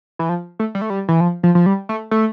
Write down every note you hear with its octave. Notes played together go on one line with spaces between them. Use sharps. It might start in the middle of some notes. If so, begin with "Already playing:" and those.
E3
F3
A3
G3
A3
G3
E3
F3
F3
F3
G3
A3
A3